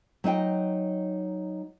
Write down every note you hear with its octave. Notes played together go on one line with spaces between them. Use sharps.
F#3 D#4 D#5 G5